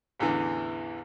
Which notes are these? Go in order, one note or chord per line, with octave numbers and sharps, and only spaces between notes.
A1 E2 D3 E3